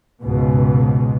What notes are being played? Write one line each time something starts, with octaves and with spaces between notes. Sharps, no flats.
C#2 G#2 B2